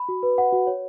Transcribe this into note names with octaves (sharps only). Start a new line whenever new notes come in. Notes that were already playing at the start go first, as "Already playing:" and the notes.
Already playing: B5
F#4
B4
F#5
F#4
C#5